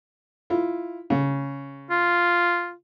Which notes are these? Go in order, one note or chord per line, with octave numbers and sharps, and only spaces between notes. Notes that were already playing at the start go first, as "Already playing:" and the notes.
E4 F4
C#3
F4